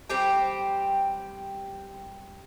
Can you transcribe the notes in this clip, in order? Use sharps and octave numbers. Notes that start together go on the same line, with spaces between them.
G3 C4 G4 G5